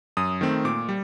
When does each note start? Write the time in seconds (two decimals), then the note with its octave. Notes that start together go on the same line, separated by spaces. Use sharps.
0.17 F#2 D#6
0.41 D#3 A3 C4
0.65 A#2 D6
0.89 G3